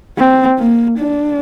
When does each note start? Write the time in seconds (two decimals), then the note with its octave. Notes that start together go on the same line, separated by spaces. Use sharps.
0.18 C4
0.59 A#3
0.99 D4